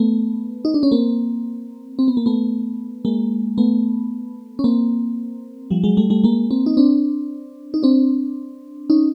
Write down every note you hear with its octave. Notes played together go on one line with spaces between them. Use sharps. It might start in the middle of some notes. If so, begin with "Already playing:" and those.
Already playing: A3 B3
D#4
D4
C#4
A#3 C4
C4
B3
A#3
A3 B3
G#3 A#3
A3 B3
C#4
A#3 C4
F3 G3
F#3 G#3
G3 A3
G3 A3
G#3 A#3
A#3 C4
D#4
C4 D4
D#4
C4 D4
C#4 D#4